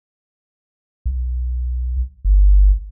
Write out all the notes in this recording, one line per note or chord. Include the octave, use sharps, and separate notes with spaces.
B1
G1